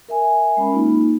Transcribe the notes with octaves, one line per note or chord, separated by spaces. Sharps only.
A#4 E5 G#5
G#3 C#4 B5
A#3 D#4 F4